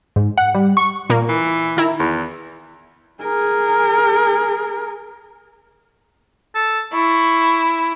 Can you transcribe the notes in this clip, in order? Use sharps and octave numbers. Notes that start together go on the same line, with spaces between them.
G#2
F#5
G3
C#6
A#2 A#3
E3
D#3 E4 A#5
E2
G#4 A#4
A4
E4 C#6